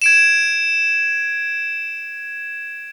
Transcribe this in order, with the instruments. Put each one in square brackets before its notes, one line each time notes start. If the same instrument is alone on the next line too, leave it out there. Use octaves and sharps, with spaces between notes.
[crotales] G#6 D7 E7